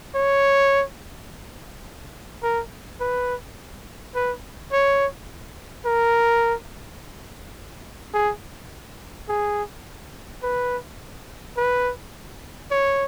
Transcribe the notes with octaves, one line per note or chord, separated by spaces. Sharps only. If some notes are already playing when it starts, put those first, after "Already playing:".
C#5
A#4
B4
B4
C#5
A#4
G#4
G#4
B4
B4
C#5